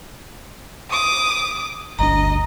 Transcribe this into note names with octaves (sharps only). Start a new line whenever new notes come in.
D6 D#6
G1 D2 D4 D#5 A#5